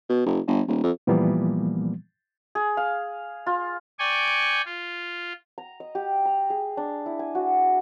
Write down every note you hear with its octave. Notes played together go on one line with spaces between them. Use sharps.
B2
F#1
G1
D#1
F2
A#2 E3 F3 G3 A#3 B3
G#4
F5
F4
D5 G5 G#5 C#6
F4
A#5
D#5
G4
A#5
G#4
D4
E4
G#5
F#4